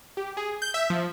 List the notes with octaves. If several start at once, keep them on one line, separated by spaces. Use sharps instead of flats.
G4
G#4
G6
E5
F3